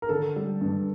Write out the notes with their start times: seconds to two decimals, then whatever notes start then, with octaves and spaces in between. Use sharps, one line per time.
0.02 A#4
0.09 D3 A4
0.36 G3
0.61 G2